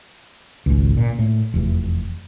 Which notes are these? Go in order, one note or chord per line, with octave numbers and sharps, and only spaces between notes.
G#1 C#2
A#2
A2
F1 E2